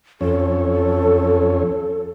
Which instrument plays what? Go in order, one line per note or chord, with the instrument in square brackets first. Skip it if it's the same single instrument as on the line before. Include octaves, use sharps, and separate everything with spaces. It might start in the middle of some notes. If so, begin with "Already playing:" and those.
[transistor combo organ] F2 C#4 [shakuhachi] A4